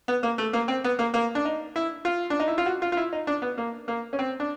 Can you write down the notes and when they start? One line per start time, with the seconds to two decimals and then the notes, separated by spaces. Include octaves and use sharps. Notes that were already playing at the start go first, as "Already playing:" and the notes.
0.08 B3
0.23 A#3
0.38 A3
0.53 A#3
0.68 C4
0.84 B3
0.99 A#3
1.14 A#3
1.35 D4
1.45 D#4
1.76 E4
2.05 F4
2.30 D4
2.40 D#4
2.48 E4
2.58 F4
2.66 F#4
2.82 F4
2.92 F4
2.97 E4
3.13 D#4
3.27 D4
3.42 B3
3.58 A#3
3.88 A#3
4.13 C#4
4.19 C4
4.40 D4